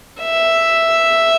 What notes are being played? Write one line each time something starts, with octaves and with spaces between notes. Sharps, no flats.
E5